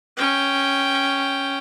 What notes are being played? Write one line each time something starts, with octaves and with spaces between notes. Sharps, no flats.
C#4 G5